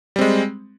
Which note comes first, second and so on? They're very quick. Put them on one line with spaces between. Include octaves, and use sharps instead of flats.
G3 C4 G#3